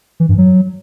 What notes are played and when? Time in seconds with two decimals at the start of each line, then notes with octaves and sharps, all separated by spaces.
0.20 E3
0.29 G2
0.38 F#3